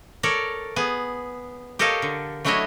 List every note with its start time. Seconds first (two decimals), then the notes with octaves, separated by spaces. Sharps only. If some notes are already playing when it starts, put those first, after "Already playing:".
0.23 A4 A#4 C#5 D5
0.76 B3 G#4
1.79 G4 A4 A#4 C#5 D#5 F5
2.02 D3
2.45 F#3 A3 D4 E4 C#5 D#5